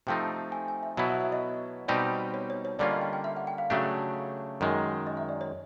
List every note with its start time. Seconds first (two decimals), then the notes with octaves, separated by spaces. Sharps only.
0.07 C3 F3 A3 C4 D#4 G5
0.52 G#5
0.68 G#5
0.83 E5
0.97 B2 F#3 B3 E4 E5
1.10 E5
1.21 E5
1.32 D#5
1.88 B2 G3 C4 D#4 G4 D5
2.34 C#5
2.50 C#5
2.65 C#5
2.79 D3 G3 A#3 C#4 F4 D5
2.91 D#5
3.02 G5
3.13 G5
3.24 E5
3.37 F#5
3.47 G5
3.58 F5
3.70 C#3 F#3 A3 D4 G4 E5
4.61 F#2 D#3 G#3
5.07 D#5
5.17 E5
5.29 D5
5.41 C#5